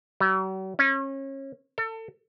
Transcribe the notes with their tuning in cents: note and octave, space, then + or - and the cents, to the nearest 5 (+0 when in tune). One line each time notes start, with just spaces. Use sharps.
F#3 +45
C#4 -30
A4 +30